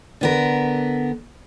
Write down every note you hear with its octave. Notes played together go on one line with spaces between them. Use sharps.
D3 B3 A#4